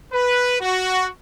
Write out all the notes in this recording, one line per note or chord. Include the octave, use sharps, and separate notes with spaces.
B4
F#4